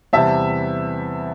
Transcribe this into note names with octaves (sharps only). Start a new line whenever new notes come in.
E2 C3 E3 G3 E5 A5